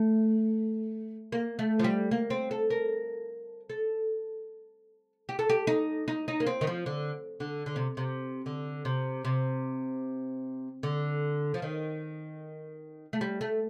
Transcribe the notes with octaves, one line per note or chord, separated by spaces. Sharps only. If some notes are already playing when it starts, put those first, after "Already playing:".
Already playing: A3
A#3
A3
F3
G3
A#3
C4
A4
A#4
A4
G4
A4
G4
D#4
D#4
D#4
A#3
C4
D#3
F3
D3
D3
D3
C3
C3
D3
C3
C3
D3
F3
D#3
A3
G3
A3